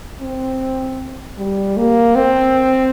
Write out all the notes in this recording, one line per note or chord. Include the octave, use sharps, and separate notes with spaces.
C4
G3
A#3
C4